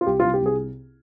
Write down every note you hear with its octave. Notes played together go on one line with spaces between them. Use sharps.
F4
C2 G4
F4
C2
G4
C2 G#4